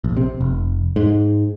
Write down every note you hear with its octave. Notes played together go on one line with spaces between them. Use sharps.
A#1
C3
F1
G#2